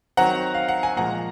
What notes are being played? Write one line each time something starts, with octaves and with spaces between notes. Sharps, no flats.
D#3 F#3 C4 F#5 A#5
F5
F#5
G#5
A#2 F3 G#3 F#5 A#5